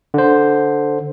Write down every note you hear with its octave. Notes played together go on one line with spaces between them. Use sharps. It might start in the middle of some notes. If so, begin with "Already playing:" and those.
D3 C5